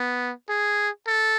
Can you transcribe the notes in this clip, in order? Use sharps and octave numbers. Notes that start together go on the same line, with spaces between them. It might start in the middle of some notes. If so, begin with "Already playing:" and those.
Already playing: B3
G#4
A4